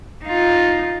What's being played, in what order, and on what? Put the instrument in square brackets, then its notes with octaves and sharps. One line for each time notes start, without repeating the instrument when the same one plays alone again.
[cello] D#4 F4